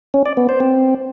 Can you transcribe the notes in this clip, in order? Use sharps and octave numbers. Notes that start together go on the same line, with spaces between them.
C#4
D5
B3
C5
C4